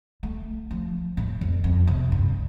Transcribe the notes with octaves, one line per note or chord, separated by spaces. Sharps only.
A3
F3
A2
F2
F2
C3
G2